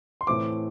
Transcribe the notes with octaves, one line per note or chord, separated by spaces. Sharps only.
C6
A2 E3 A3 C4 D6